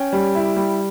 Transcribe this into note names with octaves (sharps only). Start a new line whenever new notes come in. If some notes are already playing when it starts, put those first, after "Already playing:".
Already playing: C#4 G5
G3
E4
G3